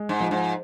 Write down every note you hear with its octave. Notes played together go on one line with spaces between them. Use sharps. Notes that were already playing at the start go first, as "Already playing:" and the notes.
Already playing: G#3
G#2
F3
G#2